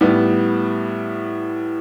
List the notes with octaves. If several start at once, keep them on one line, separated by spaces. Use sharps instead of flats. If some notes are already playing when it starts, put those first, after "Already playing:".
A2 G3 B3